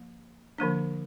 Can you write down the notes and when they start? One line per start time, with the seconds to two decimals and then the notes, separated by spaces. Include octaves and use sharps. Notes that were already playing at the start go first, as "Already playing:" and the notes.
Already playing: F3 A#3
0.58 D3 F3 A#3 D4